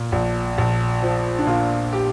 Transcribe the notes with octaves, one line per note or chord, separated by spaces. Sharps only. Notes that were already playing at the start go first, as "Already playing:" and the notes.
Already playing: A#2
A#1
A#1
F3
D4
A#2 F4
G4